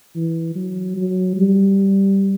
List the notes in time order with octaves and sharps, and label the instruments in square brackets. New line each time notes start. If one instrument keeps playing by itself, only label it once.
[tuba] E3
F#3
F#3
G3